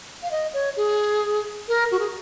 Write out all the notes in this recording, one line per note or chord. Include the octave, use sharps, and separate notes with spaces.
F5
D#5
C#5
G#4
A#4
F#4
G#4